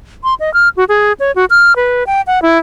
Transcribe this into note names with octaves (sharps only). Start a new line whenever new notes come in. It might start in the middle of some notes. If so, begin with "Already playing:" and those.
C6
D#5
F6
F#4
G#4
C#5
F#4
F6
B4
G5
F#5
E4